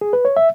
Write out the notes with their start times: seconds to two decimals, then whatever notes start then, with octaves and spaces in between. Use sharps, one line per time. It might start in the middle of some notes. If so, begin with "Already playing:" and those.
0.01 G#4
0.13 B4
0.25 C#5
0.37 E5